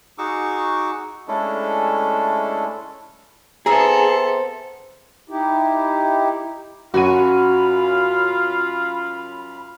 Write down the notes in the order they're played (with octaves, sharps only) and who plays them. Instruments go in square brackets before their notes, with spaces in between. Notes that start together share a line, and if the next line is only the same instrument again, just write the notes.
[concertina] D#4 F#4 G#4 C#6 D6 E6
G#3 A3 C#4 D4 E4 A4
[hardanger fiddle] B3 A4 [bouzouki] C4 C5 E5 [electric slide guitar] G#4 [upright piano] A#5
[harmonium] D#4 E4 G4
[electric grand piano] F#2 C#4 D#7 [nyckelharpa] F4 F5 [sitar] F#4 [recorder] B5